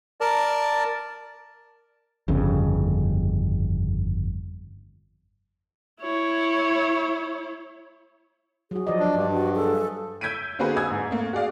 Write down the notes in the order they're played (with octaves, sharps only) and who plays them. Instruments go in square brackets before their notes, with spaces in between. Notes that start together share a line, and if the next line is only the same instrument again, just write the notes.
[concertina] A#4 D5 A5
[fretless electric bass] G1 F2 C#3
[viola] E4 C#5
[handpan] F#3 F#4 [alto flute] G#4
[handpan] F3 D5 D#5
[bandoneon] D4
[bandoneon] G2 [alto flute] D4
[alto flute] F#4
[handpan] G#4 [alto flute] A4
[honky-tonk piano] E6 G6 G#6 B6 D7 D#7
D3 A#3 C4 F#4 G#4 B4
G#5 D#6 E6 G#6
G#2
A3 A#3
F#4 G#4 D5 F5